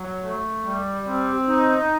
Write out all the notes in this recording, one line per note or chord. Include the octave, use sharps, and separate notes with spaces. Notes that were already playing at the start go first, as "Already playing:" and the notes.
Already playing: F#3
A3
G3
C4
D#4